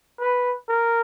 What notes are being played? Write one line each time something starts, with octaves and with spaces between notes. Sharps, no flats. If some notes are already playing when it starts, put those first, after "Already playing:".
B4
A#4